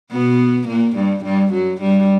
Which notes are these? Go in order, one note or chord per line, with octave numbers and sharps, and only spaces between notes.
B2 B3
A#2 A#3
G2 G3
G2 G3
F#2 F#3
G2 G3